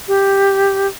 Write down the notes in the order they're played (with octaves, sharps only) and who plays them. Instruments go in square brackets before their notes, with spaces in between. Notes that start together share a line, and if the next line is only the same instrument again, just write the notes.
[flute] G4